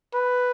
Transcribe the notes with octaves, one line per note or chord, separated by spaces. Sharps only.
B4